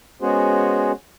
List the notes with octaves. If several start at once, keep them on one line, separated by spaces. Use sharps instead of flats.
G#3 B3 C#4 F#4 G#4 C5